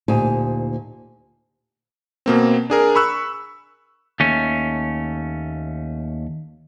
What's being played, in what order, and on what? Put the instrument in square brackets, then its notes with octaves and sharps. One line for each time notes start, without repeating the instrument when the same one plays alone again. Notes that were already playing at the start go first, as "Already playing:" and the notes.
[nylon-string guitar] D2 A#2 D#4 G4 C5 G#5
[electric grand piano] B2 A#3 C4
D4 G#4 A#4
B5 C#6 E6 F#6
[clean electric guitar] D#2 A3 C#4